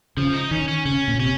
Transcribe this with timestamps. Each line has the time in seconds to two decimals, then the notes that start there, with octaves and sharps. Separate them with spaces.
0.17 C#3 F3
0.34 D#4
0.51 D#3 C#4
0.68 C#4
0.85 C#3 C#4
1.08 A#2
1.20 C3 C#4